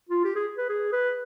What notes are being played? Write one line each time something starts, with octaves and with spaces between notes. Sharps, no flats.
F4
G4
G#4
B4
G#4
B4